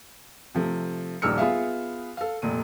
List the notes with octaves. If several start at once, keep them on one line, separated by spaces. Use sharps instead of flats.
C3 F3 A3
D#1 A#1 D#4 E6 F6 C#7
B3 F4 G#4 E5 F5
A4 F5
F1 A#2 D#7